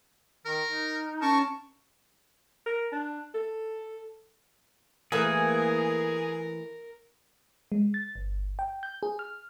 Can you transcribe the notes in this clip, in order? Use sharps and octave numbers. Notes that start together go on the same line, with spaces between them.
D#3 A#4
D#4
C#4 A#4 A5 C#6
A#4
D4
A4
E3 A3 A#3 G#4 A#4
G#3
A6
G1
G5
G6
G#4
F6